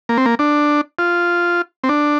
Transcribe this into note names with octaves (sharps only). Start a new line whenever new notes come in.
A#3
C4
A#3
D4
F4
C4
D4